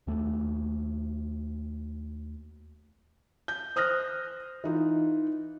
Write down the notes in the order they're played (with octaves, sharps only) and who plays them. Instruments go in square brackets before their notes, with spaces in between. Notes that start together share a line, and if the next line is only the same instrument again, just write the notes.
[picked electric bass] D#2 A3
[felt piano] G6
C5 D#6 F6 F#6 A#6
E3 D#4 F4